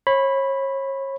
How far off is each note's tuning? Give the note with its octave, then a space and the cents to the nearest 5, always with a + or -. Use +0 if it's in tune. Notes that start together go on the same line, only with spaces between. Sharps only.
C#5 -35 B5 +0